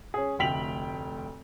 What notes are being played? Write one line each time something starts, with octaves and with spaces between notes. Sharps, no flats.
C#4 G#4
F1 D2 G5 B6 F7 F#7